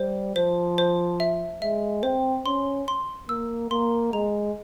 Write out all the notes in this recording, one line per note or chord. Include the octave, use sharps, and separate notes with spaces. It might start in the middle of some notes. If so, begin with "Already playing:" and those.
Already playing: G3 C5
F3 C5
C5
E5
G#3 E5
C4 C5
C#4 C6
C6
A#3 E6
A#3 C6
G#3 A#5